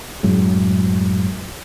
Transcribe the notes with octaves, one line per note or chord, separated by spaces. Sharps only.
F#2 A2 F#3 G#3